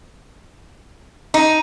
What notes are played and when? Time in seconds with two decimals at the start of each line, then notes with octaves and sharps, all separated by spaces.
1.34 D#4